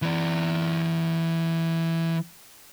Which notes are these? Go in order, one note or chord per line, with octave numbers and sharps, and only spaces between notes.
E3 D5